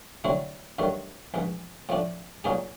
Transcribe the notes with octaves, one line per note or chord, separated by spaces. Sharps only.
D3 F#3 A3 C4 E4
G2 D#3 F#3 A3
A#1 G#2 E3
A2 F3 A3 D4
A#2 F#3 A#3 D#4 G#4